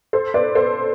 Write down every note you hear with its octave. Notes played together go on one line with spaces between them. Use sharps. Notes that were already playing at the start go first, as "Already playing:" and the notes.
A4 C5
B4 D5
A4 C5